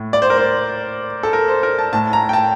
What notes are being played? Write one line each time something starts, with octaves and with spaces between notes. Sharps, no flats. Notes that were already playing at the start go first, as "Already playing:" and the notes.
Already playing: A2
D5
C5
A#4
C5
A4
A#4
C5
A#4
A5
A2 A5
A#5
G5
A5